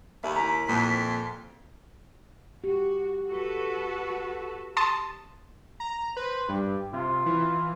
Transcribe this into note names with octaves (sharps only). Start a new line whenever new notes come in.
D#2 E5 B5
E4 A#5 B6
F2 A#2
F#4 G4
F#4 A4 B4
A5 C6 D#6
A#5
B4 C5
G2 G4
C3 F4
E3